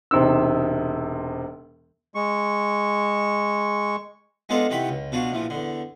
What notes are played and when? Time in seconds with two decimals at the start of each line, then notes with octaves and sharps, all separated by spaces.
0.11 E1 C3 D#4 E6
2.15 G#3 C#6
4.49 G#3 B3 D4 D#4 F4 A4
4.70 C3 D#3 E3 F#5 G5 B5
4.88 C#2
5.12 B2 D4 F4 F#4
5.32 A#1 E3 F3
5.50 E2 D3